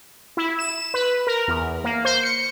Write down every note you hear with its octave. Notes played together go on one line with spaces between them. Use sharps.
E4
E7
B4
A#4
E2
A#3
C5
C#7